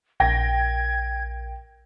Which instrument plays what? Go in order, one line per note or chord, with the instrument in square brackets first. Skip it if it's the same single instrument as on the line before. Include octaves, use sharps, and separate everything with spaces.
[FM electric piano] A#1 [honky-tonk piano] G5 A#6 [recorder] G#6